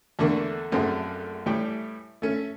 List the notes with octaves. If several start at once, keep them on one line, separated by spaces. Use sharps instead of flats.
E2 D3 A3 A#3 D4 C#6
A#1 F#2 A3 C4 G#4
A2 E3 G3 D5 G5
A3 C#4